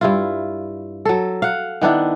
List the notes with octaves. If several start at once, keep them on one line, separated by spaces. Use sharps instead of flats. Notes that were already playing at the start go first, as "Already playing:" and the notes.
G2 E4 F4
F#3 A4
F5 F#5
D#3 B3 D4 E4